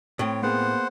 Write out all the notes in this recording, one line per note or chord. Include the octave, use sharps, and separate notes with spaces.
A2 C4 C#5
A#3 B3 G#4 C5 F#5